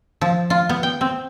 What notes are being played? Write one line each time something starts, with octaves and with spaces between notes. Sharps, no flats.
F3
F4
B3
G5
C4